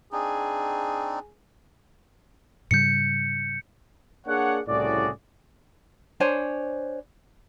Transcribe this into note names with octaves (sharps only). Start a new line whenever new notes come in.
C4 D4 D#4 G#4
G#2 C#3 G3 G6 C#7
A#3 D4 G#4 C#5 D5 F#5
C2 A2 C#3 F#4 G#4 D5
D4 C5 C#5 G#5